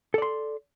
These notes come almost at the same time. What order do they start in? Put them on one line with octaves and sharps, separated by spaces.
A4 D5 C6